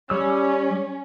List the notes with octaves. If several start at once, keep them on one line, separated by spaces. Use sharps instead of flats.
G3 C#4 E6